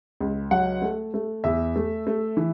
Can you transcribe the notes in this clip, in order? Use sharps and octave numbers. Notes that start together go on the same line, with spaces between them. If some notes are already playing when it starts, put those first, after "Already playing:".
C#2
F#3 F#5
A3
A3
E2 E5
A3
A3
E3